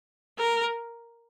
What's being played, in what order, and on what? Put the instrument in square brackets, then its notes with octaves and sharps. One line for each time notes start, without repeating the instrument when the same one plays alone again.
[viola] A#4